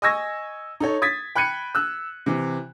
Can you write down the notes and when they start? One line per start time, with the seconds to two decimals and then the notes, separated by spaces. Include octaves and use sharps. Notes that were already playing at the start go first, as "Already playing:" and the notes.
0.02 D#5 G#5 C#6 E6 G#6 A#6
0.80 D#4 A4 C#5
1.02 D#6 G#6 A6 B6
1.35 G5 B5 F#6 G#6 C#7 D#7
1.75 E6 F#6
2.26 C3 E3